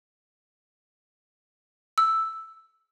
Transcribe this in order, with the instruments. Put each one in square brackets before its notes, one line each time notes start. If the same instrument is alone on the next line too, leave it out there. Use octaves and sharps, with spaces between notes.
[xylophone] E6